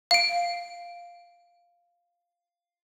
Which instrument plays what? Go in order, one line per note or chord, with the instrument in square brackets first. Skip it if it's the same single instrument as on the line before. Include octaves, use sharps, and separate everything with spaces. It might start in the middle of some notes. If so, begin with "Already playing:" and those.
[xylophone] F5 D7